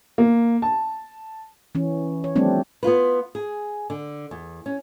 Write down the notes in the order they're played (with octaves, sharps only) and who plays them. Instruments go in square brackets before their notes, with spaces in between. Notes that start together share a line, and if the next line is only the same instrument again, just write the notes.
[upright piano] A#3
A5
[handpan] E3 C#4
C#5
F3 G3 A3 C4 D4
[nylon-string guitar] B3 E4 F4 B4
G#4
D3
E2
C#4